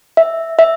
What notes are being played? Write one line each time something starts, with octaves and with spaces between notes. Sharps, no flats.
E5
E5